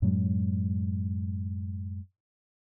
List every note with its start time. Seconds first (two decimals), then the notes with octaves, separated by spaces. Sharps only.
0.02 F#2 A2 F#3 G#3